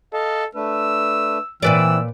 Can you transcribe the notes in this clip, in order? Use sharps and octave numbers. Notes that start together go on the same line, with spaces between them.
A4 D#5 F5 A5
A3 D4 B4 E6
A#2 E3 C4 E4 B4 D5 E6